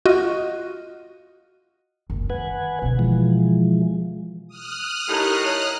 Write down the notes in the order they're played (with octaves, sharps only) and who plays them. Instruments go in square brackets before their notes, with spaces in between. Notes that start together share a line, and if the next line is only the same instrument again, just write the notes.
[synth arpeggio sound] F4 F#4 D#5
[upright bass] F#1 C#2
[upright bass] D#3 [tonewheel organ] B4 F#5 G#5
[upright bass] B2 D3
[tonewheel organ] E3 F3 G#3
[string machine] D#6 F6 F#6
[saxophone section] A2 [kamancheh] D#4 A#4 [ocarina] G4
[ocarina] C#5